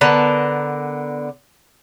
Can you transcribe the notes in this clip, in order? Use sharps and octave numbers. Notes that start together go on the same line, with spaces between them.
D3 B3 A#4 A5